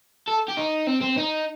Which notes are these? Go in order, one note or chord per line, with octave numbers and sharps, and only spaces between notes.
A4
G4
D#4
C4
C4
D#4